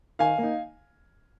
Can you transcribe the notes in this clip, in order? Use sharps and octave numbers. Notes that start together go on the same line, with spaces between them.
D#3 F5 G#5
A#3 D#4